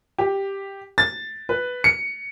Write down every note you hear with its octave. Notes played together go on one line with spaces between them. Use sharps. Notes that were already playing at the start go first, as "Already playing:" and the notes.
G4
A6
B4
C#7